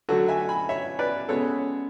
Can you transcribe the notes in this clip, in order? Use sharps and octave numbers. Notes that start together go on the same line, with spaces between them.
D3 F#3 A3 F#4 A4
E5 G#5
G#5 B5
C#5 E5
B4 D5
C#3 G#3 B3 A4 C#5